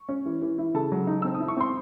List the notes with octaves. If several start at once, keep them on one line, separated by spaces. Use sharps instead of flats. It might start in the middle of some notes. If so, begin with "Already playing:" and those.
Already playing: C#6
C#4
E3
E3
E4
C#3 A4 A5
F#3
D#4
C4 E6
D#6
E4
C#6
C4 C6